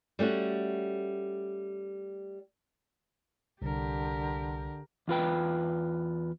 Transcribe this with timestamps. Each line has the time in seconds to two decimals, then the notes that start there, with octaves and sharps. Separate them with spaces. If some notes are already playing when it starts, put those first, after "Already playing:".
0.19 G3 A3 C#4 F#4
3.62 C2 D3 G4 A#4
5.08 E2 F4 B4 G5